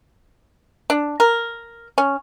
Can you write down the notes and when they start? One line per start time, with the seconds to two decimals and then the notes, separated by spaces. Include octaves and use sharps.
0.90 D4
1.20 A#4
1.98 C#4